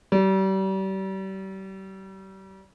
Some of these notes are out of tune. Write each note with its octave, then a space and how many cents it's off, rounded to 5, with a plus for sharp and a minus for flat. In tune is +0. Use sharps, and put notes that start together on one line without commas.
G3 -35